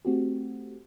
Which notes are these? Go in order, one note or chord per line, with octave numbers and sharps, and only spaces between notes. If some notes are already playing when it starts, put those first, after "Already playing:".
A3 C4 F#4 G4